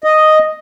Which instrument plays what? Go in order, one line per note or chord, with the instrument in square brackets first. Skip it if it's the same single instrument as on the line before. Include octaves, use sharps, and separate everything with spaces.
[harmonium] D#5